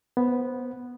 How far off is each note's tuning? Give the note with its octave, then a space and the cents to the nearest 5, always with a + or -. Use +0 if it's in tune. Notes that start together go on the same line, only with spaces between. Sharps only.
B3 +0 C5 +0